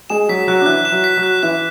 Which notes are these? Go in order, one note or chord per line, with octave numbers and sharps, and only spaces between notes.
G#3 G#4 E7
F#3 F#4 B6
F#3 F#4 F#6
D4
E3 E4 F#6
E7
F#3 F#4
B6
F#3 F#4
F#6
E3 E4 F#6